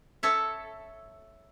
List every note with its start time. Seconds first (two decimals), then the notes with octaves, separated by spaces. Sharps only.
0.23 A4 C#5 E5